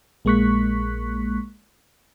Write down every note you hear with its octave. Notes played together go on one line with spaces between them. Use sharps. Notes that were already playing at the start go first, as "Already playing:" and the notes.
A#1 G#3 A#3 C#6 F#6 B6